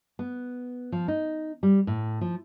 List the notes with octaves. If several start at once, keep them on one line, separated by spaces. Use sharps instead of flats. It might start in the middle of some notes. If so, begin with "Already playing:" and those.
B3
F3
D#4
G3
A2
F3